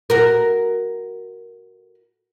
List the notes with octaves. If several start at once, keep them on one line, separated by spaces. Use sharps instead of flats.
F#4 A#4